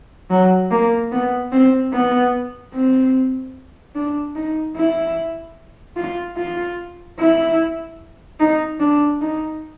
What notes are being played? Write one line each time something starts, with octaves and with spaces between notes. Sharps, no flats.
F#3
A#3
B3
C4
B3
C4
D4
D#4
E4
F4
F4
E4
D#4
D4
D#4